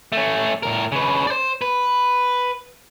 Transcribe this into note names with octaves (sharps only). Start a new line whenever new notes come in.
A3 C#4
A2 A#4
C#3 B4
C5 D5
B4